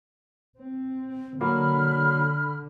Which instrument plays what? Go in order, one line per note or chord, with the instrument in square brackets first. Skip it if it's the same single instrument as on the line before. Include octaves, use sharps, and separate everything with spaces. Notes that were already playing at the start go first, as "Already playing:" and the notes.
[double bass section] C4
[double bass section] D3 [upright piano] F#3 A#3 [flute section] B5 F6